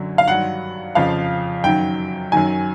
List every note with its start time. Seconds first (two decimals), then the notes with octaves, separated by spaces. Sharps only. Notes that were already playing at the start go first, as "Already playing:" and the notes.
Already playing: F#2 D3 F#3
0.18 F5
0.28 G2 D#3 F#3 F#5
0.95 F2 C#3 F3 F5
1.64 F#2 D#3 F#3 G5
2.32 F#2 D#3 F#3 G#5